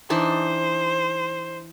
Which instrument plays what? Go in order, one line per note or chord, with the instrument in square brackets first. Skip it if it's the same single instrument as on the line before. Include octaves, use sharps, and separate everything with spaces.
[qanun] E3 D4 D#4 [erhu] C5